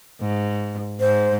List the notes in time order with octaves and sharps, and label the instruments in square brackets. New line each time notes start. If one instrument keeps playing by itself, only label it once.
[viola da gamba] G#2
[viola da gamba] G#2 [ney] C5